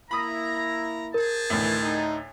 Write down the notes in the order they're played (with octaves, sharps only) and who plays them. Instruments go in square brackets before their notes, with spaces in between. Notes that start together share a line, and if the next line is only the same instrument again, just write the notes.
[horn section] A#3 E4 [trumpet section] A#5 [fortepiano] B5 D#6
[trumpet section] G#4 C5 A5 [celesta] A#4
[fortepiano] D2 A2 [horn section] D#3 E3
[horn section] D#4